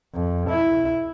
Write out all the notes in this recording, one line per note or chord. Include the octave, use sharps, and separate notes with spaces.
F2
E4